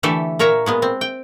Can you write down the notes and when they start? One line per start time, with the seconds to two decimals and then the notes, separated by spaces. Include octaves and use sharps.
0.03 D3 E3 A3 G4 A4 E5
0.39 A#2 A#4 C#5 E5 A#5
0.66 A#2 G#3 B3
0.82 C4
1.01 G5